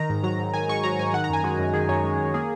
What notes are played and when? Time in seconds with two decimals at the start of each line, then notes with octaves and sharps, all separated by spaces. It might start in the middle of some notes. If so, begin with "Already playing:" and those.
Already playing: D#3 A#5
0.09 G#2
0.23 F#3 A#5
0.38 G#2
0.54 D#3 G#5
0.68 G#2 C#6
0.83 F#3 A#5
0.99 G#2 G#5
1.13 D#3 F#5
1.24 A#5
1.30 F#2 G#5
1.44 G#3 F#4
1.59 F#2
1.73 D#3 G#4
1.89 F#2 C#5
2.04 G#3
2.19 F#2
2.34 A#3 G#4